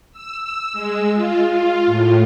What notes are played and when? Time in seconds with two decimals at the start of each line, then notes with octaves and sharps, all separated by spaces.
0.12 E6
0.42 E6
0.73 G#3
1.13 F4
1.50 F4
1.86 A2